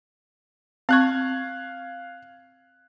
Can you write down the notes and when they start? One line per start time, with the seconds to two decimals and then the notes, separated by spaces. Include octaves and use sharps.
0.89 C4 F5 C#6 F#6 G#6